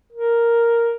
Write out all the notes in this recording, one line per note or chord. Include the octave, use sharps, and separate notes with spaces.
A#4